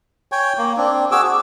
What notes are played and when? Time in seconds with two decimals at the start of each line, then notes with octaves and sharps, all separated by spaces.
0.32 C#5 G5 G#5
0.58 A#3
0.77 C4 D4
1.12 F#4 G#4 D6 E6
1.24 G#4